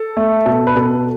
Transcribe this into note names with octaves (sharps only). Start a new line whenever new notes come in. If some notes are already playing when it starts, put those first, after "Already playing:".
Already playing: A4
A3
B2 A4
B4
B2 A4